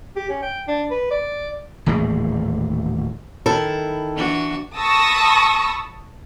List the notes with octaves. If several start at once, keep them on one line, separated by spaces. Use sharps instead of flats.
G4
C#4
G5
D4
B4
D5
D#1 A2 E3 G#3
D#3 E4 A4
E3 D4 F#4
A5 B5 C#6 D#6 E6 A#6